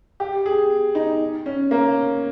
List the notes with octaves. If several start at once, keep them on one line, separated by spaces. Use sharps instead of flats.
G4
G#4
D#4
C#4
A#3